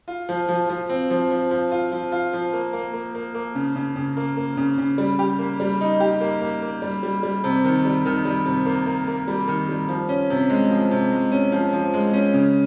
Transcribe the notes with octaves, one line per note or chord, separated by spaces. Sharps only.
F4
F3
F3
F3
C4
F3
F3
F3
F4
F3
F4
F3
A#3
A#3
A#3
A#3
A#3
C#3
C#3
C#3
A#3
A#3
C#3
C#3
G3
G4
A#3
G3
D#4
G4
A#3
A#3
A#3
G3
G3
G3
C3
D#3
G3
D#3
G3
C3
A#3
A#3
A#3
G3
D#3
G3
F3
C#4
C3
G#3
F3
C3
G#3
C#4
F3
F3
G#3
C#4
C#3